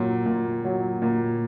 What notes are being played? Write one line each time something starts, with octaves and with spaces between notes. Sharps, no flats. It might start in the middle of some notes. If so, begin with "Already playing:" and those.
Already playing: A#2 F#3
A#2
F#3
A#2